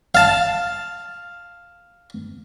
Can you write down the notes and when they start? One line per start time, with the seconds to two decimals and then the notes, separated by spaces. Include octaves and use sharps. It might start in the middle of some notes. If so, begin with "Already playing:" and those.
0.15 F5 A5